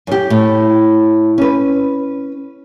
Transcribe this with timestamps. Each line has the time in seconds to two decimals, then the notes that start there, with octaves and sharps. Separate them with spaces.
0.07 F#2 G4
0.30 A2
1.38 C#4 B4